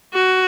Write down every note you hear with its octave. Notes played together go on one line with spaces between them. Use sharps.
F#4